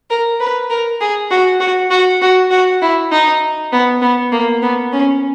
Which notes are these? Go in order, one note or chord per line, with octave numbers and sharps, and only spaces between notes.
A#4
B4
A#4
G#4
F#4
F#4
F#4
F#4
F#4
E4
D#4
B3
B3
A#3
B3
C#4